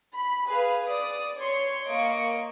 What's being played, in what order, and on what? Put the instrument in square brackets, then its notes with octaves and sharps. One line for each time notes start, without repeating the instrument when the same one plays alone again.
[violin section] B5
G#4 B4 F5
D5 D#6
C#5 C6 C#6
A#3 D#5 C#6 D7